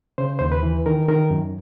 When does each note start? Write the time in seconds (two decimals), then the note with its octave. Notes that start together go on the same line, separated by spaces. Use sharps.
0.18 C#3 C5
0.39 D#2 C5
0.52 B4
0.63 E3
0.86 D#3 A#4
1.08 D#3 A#4
1.30 F#2